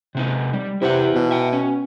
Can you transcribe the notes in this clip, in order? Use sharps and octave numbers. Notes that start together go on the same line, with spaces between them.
C3 C4 D#4
G3
C3 E4 B4 F#5
B2
E5 G5
C#4